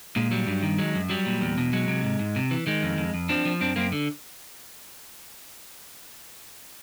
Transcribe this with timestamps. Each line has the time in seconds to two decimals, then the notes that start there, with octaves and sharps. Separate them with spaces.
0.16 A#2 G#3
0.31 F#3 G3
0.47 G2
0.63 D#3
0.78 F#3 G#3
0.95 F#2
1.10 F#3 G3
1.26 A#2
1.41 E2
1.58 B2
1.73 F#3 G#3
1.88 C3
2.04 G#2
2.19 G#2
2.36 C3
2.51 E3
2.67 D#3 G#3
2.83 F2
2.98 F2
3.14 F2
3.29 F3 C4 D4
3.45 F3
3.61 F#2 C4 D4
3.76 F#2 A#3 C4
3.92 D3